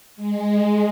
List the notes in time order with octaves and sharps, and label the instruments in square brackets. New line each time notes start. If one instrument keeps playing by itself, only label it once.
[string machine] G#3